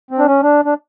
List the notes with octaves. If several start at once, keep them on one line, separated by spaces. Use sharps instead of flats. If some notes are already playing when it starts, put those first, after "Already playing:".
C4
D4
C#4
D4
D4